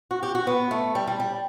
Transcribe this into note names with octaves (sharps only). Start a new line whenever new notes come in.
F#4
G4
F#4
B3
A3
G3
G3
G3